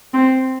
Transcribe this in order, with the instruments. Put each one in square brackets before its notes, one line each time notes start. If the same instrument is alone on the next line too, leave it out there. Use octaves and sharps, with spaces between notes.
[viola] C4